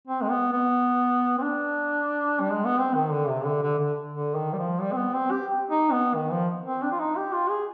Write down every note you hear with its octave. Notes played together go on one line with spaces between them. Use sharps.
C4
G#3
B3
B3
C4
D4
G3
G#3
B3
C4
D#3
D3
C3
D3
D3
D3
D3
D#3
G3
F3
G3
C4
B3
C4
G4
D#4
B3
D#3
F3
C4
D4
F4
D#4
G4
F4
G#4